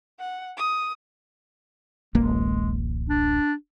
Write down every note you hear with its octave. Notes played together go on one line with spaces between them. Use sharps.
F#5
D#6
D1 A1 G#3 A#3
D4